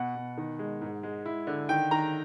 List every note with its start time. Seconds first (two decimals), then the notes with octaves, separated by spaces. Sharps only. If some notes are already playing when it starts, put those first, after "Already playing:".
Already playing: B2 F#5
0.15 B2
0.37 D#3
0.59 G#3
0.81 G#2
1.03 G#3
1.26 E4
1.47 D3
1.69 D#3 G5
1.91 D#3 A#5